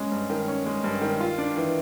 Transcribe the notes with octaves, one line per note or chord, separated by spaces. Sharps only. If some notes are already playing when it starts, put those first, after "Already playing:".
Already playing: G#3 C#4
G2
D#3
C#4
G#3
G2
D#3
F4
D4
E3